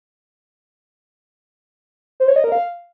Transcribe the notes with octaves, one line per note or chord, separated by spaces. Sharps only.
C5
C#5
D#5
A#4
F5